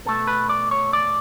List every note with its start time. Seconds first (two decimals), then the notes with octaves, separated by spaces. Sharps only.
0.05 B2 A3 A4
0.27 B4
0.49 D5
0.71 C#5
0.93 D5